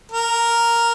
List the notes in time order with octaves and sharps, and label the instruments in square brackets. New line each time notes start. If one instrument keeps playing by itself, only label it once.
[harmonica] A#4